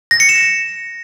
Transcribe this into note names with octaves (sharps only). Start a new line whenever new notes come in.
A#6
C#7
E7